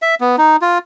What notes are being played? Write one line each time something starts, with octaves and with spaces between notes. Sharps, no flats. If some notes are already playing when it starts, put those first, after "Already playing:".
E5
B3
D#4
F4